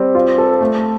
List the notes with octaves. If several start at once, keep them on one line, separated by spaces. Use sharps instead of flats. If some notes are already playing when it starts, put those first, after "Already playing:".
Already playing: G3 C4
F4
A4
A3